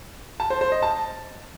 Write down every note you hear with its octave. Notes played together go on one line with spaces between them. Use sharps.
A5
C5
C5
D#5
A5